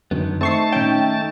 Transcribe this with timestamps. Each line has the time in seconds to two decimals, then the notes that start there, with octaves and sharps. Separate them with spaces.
0.11 F#2 D3 D#3 B3
0.41 A3 C4 D#4 A5 C#6 C7
0.72 D#3 C#4 G5